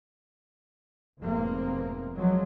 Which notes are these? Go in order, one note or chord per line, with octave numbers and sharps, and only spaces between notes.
F1 G#2 B2 F3 A#3 C4
F3 F#3 G#3